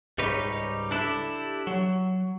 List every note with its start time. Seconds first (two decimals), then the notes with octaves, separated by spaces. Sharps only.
0.18 C#2 G#2 G3 D#4 B4 C#5
0.91 D4 E4 G4 A4
1.67 F#3